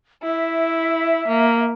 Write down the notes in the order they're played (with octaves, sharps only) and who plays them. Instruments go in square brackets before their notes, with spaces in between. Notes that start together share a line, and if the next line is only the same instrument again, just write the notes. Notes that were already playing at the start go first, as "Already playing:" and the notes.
[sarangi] E4 [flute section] E5
[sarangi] A#3